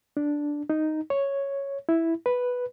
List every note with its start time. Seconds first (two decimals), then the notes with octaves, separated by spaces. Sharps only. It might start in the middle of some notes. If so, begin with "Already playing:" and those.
0.17 D4
0.70 D#4
1.10 C#5
1.89 E4
2.26 B4